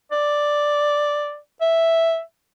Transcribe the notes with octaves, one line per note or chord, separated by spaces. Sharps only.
D5
E5